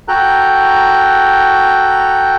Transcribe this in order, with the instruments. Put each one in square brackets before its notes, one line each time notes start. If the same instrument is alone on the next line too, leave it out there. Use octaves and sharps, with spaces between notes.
[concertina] F#4 A4 G5 A#5 F#6